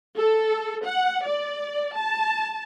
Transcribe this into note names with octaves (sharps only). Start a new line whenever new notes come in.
A4
F#5
D5
A5